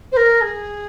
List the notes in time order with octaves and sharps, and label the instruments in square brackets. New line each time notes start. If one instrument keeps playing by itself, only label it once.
[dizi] C5
A#4
G#4